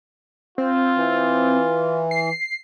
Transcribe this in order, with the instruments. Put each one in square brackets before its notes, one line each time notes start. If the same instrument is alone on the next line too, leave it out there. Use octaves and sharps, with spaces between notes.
[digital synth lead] C4 [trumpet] F4
[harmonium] E3
[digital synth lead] C7